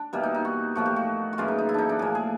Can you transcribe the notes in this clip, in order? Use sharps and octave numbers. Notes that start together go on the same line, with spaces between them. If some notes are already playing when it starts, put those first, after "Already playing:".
Already playing: D4
B2 G3 A#3 E4
D#4
D#4
F#4
A2 F3 A#3 F#4
G4
F#4
F#4
F#2 C#3 E3 F4
D#4
D#4
E4
D4 D#4
D4
A2 F3 A#3 G#4
G#4